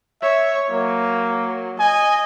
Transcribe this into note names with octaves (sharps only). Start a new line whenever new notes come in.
C#5 E5
F#3 A#3
D#5 G#5